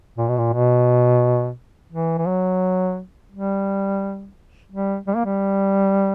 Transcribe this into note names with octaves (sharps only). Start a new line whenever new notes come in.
A#2
B2
A#2
B2
E3
E3
F#3
G3
G3
G3
A#3
G3